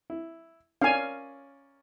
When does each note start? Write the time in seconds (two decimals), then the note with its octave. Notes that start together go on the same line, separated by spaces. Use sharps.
0.10 E4
0.81 C#4 A#4 D5 F5 G#5